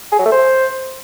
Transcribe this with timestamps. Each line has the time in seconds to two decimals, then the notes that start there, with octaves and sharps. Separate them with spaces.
0.12 G#4
0.19 F#3
0.25 A3
0.32 C5